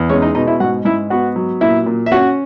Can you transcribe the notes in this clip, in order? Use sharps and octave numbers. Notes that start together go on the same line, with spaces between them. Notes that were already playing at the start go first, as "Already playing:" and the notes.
Already playing: E2
G#3 C#4 C#5
D#4 D#5
B2 D#4 D#5
E4 E5
G#2 F#4 F#5
G#2 E4 E5
B3 F#4 F#5
F#3
A#2 E4 E5
A#2
E5
C#4 F#4 F#5